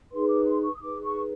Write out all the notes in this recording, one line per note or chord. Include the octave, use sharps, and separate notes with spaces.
D#4 G#4 B4 C6
D6
C6
C#6
D#6
D#4 G#4 B4 D6
C#6